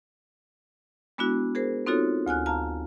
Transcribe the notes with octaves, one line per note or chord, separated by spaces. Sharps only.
G#3 B3 D4 E4 F#4
G#4 A#4 C5
C4 D#4 F4 F#4 A4 C#5
D2 G#5 F6 F#6
F5 A5 A#5 F6